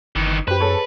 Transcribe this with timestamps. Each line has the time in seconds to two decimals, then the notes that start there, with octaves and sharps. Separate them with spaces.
0.16 G1 D#3 E3
0.48 F#2 G4 B4 C5
0.60 G#4 A4 C#5